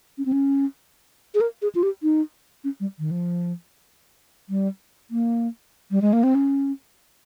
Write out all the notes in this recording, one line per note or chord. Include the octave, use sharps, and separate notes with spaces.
C#4
C4
C#4
G#4
A#4
G#4
F4
G4
D#4
C#4
G3
D#3
F3
G3
A#3
G3
G#3
A#3
C4
C#4